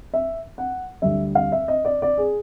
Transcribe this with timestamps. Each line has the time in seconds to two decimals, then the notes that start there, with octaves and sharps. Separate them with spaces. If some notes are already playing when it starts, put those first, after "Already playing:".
0.14 E5
0.58 F#5
1.02 D2 D3 G3 E5
1.35 F5
1.52 E5
1.68 D#5
1.85 D5
2.02 D5
2.18 G#4